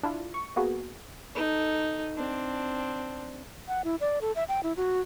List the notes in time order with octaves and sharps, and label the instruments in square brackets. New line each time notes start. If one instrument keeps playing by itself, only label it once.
[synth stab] D4 E4 F4
C#6
A#3 B3 F#4 G#4
[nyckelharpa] D#4 A4
C4 D4
[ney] F#5
E4
D5
A4
E5
G5
E4
F#4